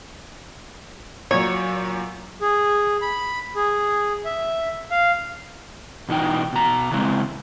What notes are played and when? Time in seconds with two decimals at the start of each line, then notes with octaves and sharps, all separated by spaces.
1.31 A#2 F#3 C#5
2.41 G#4
3.02 B5
3.55 G#4
4.25 E5
4.91 F5
6.09 B2 E3 D#4 G5
6.53 B2 A#5
6.91 C#3 E3 G#3 C4